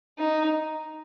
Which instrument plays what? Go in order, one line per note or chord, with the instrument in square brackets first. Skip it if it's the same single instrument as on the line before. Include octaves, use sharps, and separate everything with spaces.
[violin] D#4